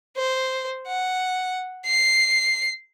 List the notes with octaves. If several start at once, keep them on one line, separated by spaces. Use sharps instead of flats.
C5
F#5
C7